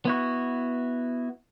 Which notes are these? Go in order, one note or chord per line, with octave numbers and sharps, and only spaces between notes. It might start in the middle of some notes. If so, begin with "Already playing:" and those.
B3 E4 F#4